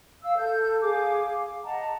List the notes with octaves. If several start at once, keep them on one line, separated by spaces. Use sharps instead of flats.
F5 E6
A4 G6
G#4 F5 D6
D#5 F#5 A5 A#5